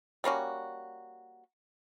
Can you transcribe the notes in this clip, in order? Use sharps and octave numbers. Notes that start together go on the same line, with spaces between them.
G3 A#3 C#4 F#4